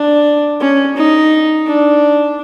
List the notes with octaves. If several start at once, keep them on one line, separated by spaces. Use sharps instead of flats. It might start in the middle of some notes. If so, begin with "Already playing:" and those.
Already playing: D4
C#4
D#4
D4